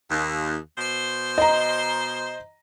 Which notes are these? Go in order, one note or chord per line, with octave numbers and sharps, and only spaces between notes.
D#2
B2 C5
D#5 A#5